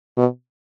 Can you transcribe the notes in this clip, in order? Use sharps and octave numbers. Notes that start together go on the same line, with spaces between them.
B2